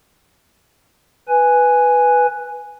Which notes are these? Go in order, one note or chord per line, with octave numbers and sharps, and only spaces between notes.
B4 G#5